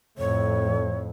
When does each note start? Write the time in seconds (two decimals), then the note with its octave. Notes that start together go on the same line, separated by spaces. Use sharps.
0.18 F2 A2 C#5